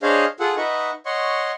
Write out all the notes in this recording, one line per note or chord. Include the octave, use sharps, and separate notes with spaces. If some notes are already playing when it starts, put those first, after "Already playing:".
D4 G#4 C5 C#5 D#5 F5
F4 G#4 A4 F#5
D#4 B4 D#5 E5 F#5 C#6
C#5 D#5 F#5 C6 C#6